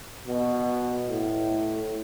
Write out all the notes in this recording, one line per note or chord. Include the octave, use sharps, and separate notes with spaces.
B2
A2